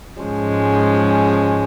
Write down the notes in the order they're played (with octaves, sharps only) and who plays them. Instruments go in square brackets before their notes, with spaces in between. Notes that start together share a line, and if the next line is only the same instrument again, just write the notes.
[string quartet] G#2 F3 G#3 C#4